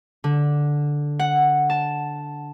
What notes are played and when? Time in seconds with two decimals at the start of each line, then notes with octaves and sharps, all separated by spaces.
0.24 D3
1.20 F#5
1.70 A5